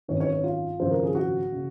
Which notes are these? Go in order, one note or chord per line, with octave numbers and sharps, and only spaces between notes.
G#1 F#2 D#3 C#5
C#5
C#5
F4
G#1 F#2 C#3 F3 C5
A#4
G#4
F#4
C#3